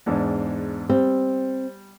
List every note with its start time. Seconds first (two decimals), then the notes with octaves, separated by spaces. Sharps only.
0.06 E2 G#2 D4
0.90 G3 C4